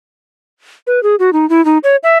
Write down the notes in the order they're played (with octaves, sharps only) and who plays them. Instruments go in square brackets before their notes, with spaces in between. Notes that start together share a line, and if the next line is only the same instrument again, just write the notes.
[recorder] B4
G#4
F#4
D#4
E4
D#4
C#5
E5